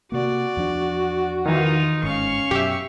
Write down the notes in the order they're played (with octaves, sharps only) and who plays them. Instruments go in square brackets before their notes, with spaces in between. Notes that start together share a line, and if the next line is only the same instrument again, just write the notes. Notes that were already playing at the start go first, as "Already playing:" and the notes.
[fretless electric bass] C3 A#3 [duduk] F#4 [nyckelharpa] D5
[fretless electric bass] E2 F3 D4
[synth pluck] D#3 E3 [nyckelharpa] D#4 F4
[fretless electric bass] G1 G#2 [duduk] C#4 [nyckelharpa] F5 C#6
[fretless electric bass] F#2 B2 F#3 [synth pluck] G4 E5